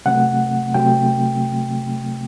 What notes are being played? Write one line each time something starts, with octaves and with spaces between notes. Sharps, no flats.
C3 F#3 A3 C4 F#5
C3 F#3 A3 C4 G5